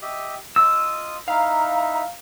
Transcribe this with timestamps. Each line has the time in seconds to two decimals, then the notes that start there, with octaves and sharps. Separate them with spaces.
0.02 G4 D#5 E5
0.56 F4 D#5 D#6 E6
1.28 D#4 E4 E5 F5 A#5